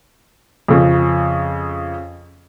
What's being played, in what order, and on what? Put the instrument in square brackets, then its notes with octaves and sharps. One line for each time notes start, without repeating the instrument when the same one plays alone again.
[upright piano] F2 C#3